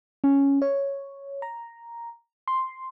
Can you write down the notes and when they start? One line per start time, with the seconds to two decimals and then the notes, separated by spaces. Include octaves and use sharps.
0.24 C#4
0.62 C#5
1.42 A#5
2.48 C6